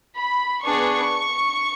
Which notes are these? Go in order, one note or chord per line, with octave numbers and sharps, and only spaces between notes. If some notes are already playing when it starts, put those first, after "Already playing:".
B5
B3 D4 G#4 C#6